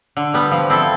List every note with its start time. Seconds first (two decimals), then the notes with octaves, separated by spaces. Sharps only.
0.17 D3
0.34 G3 B3
0.52 F3
0.70 C4 E4 A4